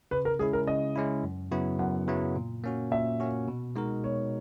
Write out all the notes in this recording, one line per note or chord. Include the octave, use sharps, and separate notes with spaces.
C#3 B4
A#4
G#3 C#4 E4 G#4
A#4
C#3 D#5
G#3 C#4 E4
F#2
C#3 F#3 B3 E4
F#2 F#5
C#3 F#3 B3 E4
A#2
A#3 C#4 F#4
A#2 E5
A#3 C#4 F#4
B2
G#3 D#4 F#4 A#4
B2 C#5